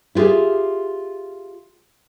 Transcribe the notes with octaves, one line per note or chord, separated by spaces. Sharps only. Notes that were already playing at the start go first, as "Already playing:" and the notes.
E4 F4 G4 G#4 E5